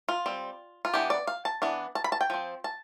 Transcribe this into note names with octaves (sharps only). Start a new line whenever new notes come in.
F4
G3 C4
F4
E3 B3 D4 G4
D5
F5
A5
E3 B3 D4
A5
B5
A5
G5
F3 C4
A5